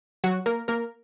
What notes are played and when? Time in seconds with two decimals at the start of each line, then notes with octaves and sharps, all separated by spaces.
0.24 F#3 F#4
0.46 A#3 A#4
0.68 A#3 A#4